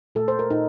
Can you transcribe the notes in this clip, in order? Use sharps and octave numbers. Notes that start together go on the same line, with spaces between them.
A#2 A3 A4
C5
A#4
A#2 D#4